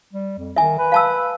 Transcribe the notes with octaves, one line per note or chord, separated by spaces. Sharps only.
G3
F2
D#3 E5 G#5
B4
F5 A5 E6